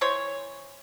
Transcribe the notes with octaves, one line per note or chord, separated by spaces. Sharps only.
E3 C5 C#5